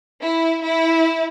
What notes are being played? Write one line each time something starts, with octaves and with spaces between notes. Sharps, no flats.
E4
E4